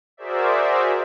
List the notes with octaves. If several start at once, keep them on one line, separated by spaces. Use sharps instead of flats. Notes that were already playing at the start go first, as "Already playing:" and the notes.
F#4 G#4 A#4 C5 D5 E5